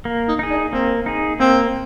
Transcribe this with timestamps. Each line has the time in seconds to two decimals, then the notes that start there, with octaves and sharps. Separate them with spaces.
0.05 A#3
0.28 D#4
0.39 D#4 G#4
0.50 D4
0.73 A#3 C4
1.06 D#4 G#4
1.40 A#3 C4